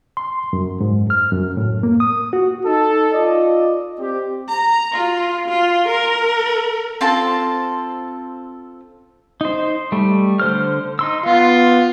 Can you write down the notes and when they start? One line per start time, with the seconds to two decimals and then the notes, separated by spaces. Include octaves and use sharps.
0.17 C6
0.53 F#2
0.81 G#2
1.10 F6
1.32 F#2
1.57 A2
1.83 A#3
2.00 D#6
2.33 F#4
2.64 D#4 A4
3.13 F4 D5 D#5
3.99 C4 G4
4.48 A#5
4.92 F4
5.48 F4
5.88 A#4
7.01 C4 F4 A4 A5
9.41 D#4 C5
9.92 G3 A3
10.40 D3 C5 F6
10.99 D#4 C6 E6
11.26 B3 F4